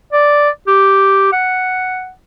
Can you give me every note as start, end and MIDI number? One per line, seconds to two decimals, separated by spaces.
0.12 0.49 74
0.67 1.29 67
1.33 2.12 78